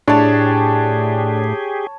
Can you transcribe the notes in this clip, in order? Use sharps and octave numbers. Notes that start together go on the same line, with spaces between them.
A2 D4 G4 G#4 C#5 A5